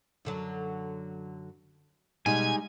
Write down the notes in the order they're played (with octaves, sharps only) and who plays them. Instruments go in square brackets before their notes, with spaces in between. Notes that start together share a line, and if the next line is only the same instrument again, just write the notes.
[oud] F#2 D3 F#3
[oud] B2 [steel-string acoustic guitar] G3 G#3 D#4 [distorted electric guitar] G#5